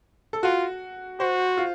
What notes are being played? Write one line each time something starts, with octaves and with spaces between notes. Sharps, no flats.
A4
F4 F#4
F#4 C5
F4